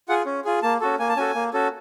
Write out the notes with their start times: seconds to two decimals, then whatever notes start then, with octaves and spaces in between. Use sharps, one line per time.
0.08 F4 G#4 F#5
0.26 C#4
0.45 F4 G#4
0.63 A#3 A5
0.81 C#4 F#4 A4
0.99 A#3 G#5
1.09 A5
1.17 C#4 F#4 A4 G#5
1.35 A#3
1.53 C#4 F#4 A4